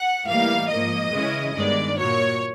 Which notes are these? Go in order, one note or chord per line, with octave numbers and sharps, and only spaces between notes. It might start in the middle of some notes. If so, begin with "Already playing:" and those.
Already playing: F#5
A2 E3 G3 A#3 D#4 F5
G#2 F3 A#3 D#5
C#3 E3 G#3 C#4 E4
G2 D#3 G#3 B3 D5
A#2 F#3 A#3 C#5